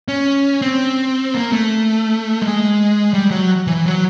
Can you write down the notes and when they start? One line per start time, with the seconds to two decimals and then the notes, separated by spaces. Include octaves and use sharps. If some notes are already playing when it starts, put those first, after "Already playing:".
0.08 C#4
0.62 C4
1.34 A#3
1.52 A3
2.42 G#3
3.14 G3
3.31 F#3
3.67 E3
3.86 F#3